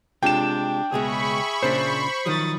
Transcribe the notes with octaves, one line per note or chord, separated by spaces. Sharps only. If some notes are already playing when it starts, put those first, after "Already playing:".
C3 G#3 D4 F4 G5 E7
C#2 B2 G#3 G#4 E5 B5 C#6
A#2 C#3 D4 C5
D#3 F3 F#3 D#6 A6